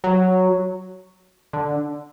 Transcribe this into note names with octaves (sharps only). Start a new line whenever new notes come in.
F#3
D3